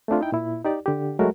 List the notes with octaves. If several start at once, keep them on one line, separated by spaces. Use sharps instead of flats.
A3 C4 D4 F4
D#4 E4 G5
A#2 E4
D#4 G4 D5
D3 G4
F#3 G#3 A3 F#4 A#4